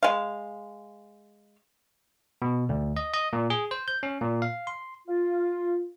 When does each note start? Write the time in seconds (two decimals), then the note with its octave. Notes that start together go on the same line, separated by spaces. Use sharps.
0.03 G#3 F5
2.42 B2
2.69 D2
2.97 D#5
3.14 D#5
3.33 A#2
3.50 G#4
3.71 C5
3.88 G6
4.03 C#4
4.21 A#2
4.42 F5
4.67 C6
5.08 F4